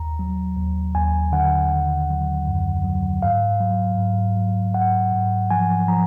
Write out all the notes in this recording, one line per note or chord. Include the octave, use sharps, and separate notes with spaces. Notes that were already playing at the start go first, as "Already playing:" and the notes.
Already playing: D#2 A#5
F#3
D#2
D#2 G#5
D3 F#5
D#3
F#3
F#2
F#3
G#2 F5
F#3
G#2
F#3
G#2 F#5
G#2
F3 G#5
F3 A#5